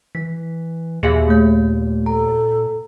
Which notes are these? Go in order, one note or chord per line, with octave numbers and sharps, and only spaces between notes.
E3 B6
D#2 A#2 G#4 E5 F5
A3 G6
A4 A#5